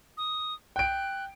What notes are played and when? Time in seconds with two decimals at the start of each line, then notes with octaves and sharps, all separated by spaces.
0.17 D#6
0.76 G5 F#6 D7